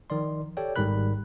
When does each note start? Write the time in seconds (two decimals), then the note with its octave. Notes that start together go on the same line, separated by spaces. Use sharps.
0.10 D#3 F3 D5 C6
0.57 G4 A4 C#5 D5 G5
0.76 G#1 G#2 G3 A#4 B5 F#6